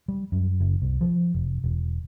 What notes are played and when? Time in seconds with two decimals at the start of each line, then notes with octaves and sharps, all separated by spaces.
0.08 G3
0.32 F#2
0.60 F#1
0.82 C2
1.01 F3
1.35 F1
1.64 E1